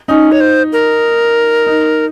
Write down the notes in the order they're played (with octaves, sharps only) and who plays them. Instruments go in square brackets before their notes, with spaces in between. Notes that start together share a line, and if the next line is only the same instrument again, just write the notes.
[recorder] C#4 [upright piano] D#4
[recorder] C#5
C5
A#4
[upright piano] D#4